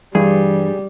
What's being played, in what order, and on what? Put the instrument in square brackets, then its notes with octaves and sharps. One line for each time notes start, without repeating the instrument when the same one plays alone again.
[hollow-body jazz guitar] G2 [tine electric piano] E3 [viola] G3 [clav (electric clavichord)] G#4